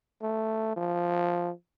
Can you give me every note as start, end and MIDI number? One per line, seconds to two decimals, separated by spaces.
0.22 0.75 57
0.76 1.50 53